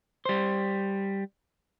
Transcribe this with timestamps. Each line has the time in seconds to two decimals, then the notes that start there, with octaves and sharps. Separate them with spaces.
0.25 G3 C5